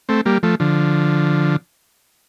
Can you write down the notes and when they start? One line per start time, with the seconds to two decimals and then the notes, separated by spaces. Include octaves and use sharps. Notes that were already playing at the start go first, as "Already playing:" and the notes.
0.09 A3 C4
0.26 G3 A#3
0.43 F3 A3
0.60 D3 F3